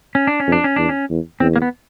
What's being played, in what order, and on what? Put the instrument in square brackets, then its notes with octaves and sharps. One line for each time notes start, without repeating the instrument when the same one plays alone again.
[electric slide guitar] C#4
D4
C#4
[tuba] F2
[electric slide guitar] D4
C#4
[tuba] E2 [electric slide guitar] D4
[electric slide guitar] C#4
[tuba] E2
[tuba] E2 [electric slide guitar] C4
[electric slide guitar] A#3
B3